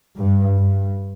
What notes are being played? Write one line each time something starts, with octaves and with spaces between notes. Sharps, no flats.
G2
G2